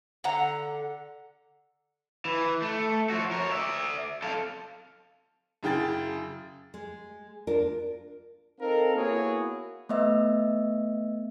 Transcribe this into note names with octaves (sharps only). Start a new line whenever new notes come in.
D3 F#5 A#5
E3
A3
F3 F#4
A#4 C#5
D5 E5
A4 F5
F#2 C#3 E4 G5 A6
G#3
D4 F4 A#4
C4 D#4 A4 A#4 F5
A#3 B3 E4 F#4 G#4 C#5
A3 B3 D#5 E5 E6